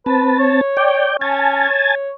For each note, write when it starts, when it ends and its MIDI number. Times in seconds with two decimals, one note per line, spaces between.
0.06 0.61 60
0.06 0.38 71
0.06 0.61 81
0.39 1.14 73
0.77 1.17 74
0.77 1.17 79
1.21 1.68 61
1.21 1.95 80
1.21 1.95 81
1.69 2.11 73